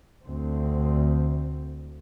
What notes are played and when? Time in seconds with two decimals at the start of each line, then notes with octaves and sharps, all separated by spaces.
0.25 D2 C4